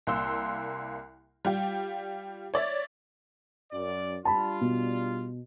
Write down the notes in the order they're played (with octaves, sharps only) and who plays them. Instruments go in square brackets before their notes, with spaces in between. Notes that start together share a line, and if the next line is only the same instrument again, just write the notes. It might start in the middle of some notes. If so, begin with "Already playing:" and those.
[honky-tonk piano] C2 A#3 C6 E6
G3 F4 G4
C#5 D5 E5
[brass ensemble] F#2 D5
[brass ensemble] G3 D4 F4 [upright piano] A5 B5
[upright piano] B2